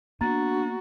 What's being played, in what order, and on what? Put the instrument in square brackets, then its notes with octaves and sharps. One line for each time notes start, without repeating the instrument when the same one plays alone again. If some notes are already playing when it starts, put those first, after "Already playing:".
[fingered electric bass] A#3 B3 [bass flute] D4 [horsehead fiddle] F#4 [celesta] A#5 A6